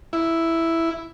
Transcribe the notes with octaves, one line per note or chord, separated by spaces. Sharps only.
E4